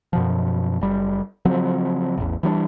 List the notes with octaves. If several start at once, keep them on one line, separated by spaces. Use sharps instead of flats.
F#2 B2 F3
F#1 G3
C#3 F3 F#3 C4
A1 E2
E3 G3 B3 D4